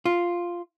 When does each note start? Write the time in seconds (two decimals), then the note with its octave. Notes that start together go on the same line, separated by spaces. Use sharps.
0.06 F4